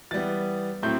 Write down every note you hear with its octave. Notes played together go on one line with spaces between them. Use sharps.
E3 G3 B3 A6
A2 F#3 A3 C4 G6